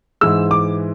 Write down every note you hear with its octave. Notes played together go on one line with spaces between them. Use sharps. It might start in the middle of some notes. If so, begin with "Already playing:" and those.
G#2 E3 G#3 E6
D6